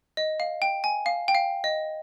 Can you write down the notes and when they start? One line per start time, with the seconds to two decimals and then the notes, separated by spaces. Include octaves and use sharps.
0.17 D#5
0.40 F5
0.62 G5
0.84 G#5
1.06 F5
1.28 G5
1.35 F5
1.64 D#5